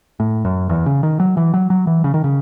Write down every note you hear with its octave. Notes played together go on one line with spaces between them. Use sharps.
A2
F#2
E2
C#3
D#3
F#3
E3
F#3
F#3
E3
C#3
D#3
C#3